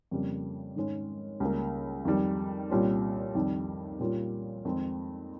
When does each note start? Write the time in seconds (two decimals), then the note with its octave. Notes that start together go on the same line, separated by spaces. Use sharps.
0.11 F2 C#3 G3 A#3
0.76 G#2 D#3 G#3 C#4
1.40 C#2 C#3 G3 A#3
2.05 F2 D#3 G3
2.70 C2 A#2 G3 C#4 F4
3.35 F2 D#3 G3
4.00 A#2 G3 A#3 C#4 F4
4.65 F2 D#3 G#3 C4 D#4